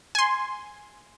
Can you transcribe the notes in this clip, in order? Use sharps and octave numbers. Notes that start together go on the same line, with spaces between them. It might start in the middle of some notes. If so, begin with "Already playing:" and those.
G#5 C6